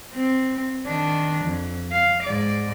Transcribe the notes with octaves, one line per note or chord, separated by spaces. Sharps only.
C4
D#3 D4
F2
F5
G#2 D5